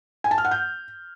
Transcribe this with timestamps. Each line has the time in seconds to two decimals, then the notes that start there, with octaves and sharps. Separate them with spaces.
0.24 G#5
0.31 A5
0.38 F6
0.45 F#5
0.51 G6